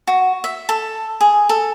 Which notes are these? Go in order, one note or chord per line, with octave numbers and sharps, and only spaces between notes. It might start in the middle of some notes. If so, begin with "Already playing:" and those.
F#4
E5
A4
G#4
A4